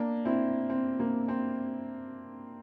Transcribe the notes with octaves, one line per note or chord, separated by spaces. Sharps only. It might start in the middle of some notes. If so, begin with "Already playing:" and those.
Already playing: A#3 D4
C4 E4
C4
A#3
C4